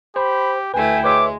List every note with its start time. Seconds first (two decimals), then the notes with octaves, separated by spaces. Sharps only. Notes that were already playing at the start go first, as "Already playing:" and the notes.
0.16 G4 C5 B5
0.74 D2 A3 E4 B4 G5 G#5
1.04 G#3 B4 C#5 E5 D6